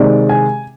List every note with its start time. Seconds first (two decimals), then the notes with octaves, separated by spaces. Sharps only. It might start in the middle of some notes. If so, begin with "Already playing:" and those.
Already playing: C3 D#3 G#3 D5
0.29 G#5